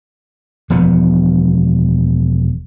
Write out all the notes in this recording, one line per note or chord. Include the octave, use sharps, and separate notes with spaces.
E1 F3 B3